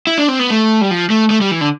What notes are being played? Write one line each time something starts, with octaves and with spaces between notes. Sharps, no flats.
E4
D4
C4
B3
A3
G3
F3
A3
A3
G3
E3
D3